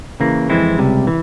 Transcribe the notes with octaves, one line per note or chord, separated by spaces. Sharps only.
C#3 E3 A#3
F2 E3 G#3 C4 E4
C#2 C3 G3
E3